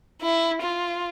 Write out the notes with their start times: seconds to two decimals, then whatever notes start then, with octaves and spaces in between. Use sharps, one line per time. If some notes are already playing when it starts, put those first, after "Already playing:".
0.22 E4
0.62 F4